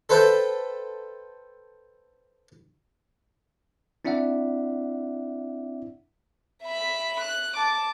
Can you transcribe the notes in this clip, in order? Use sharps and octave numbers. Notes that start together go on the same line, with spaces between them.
A4 B4 C5 E5 G5
C4 D4 E4 D5 E5 F#5
E5 B5
F#6
A5 D6